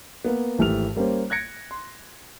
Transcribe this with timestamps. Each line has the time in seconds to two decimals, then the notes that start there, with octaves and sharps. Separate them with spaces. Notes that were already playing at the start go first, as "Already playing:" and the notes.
0.25 A#3 B3
0.58 G#1 E3 A3 G4 F6 F7
0.96 G3 A#3 C#4 C5
1.30 F#6 G#6 A#6 C#7 D7
1.71 C6